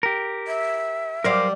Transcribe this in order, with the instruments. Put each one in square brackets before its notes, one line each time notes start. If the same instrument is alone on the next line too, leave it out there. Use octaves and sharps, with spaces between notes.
[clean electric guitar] G4 A#4
[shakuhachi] E5
[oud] F#3 G3 D5 [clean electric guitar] A#4 C5 F5